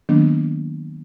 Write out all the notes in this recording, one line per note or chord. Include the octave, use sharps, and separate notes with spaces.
D#3 F#3 A#3 B3 D4